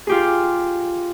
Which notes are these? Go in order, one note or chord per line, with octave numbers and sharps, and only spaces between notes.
F4 G4 G#4